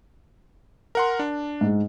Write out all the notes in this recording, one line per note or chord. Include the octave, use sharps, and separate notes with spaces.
A#4 F#5 C6
D4
G#2 G#3